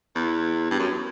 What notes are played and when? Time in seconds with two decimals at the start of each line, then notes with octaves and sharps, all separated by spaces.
0.15 E2
0.71 G2
0.79 F#2